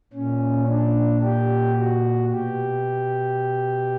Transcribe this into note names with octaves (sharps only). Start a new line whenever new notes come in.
A#2 C#4
D4
G4
F#4
B2 G4